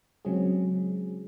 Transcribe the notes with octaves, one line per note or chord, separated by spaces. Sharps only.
C#3 F#3 G#3 C4 C#4 G#4